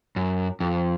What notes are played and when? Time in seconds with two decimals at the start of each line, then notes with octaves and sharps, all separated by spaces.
0.16 F#2
0.60 F2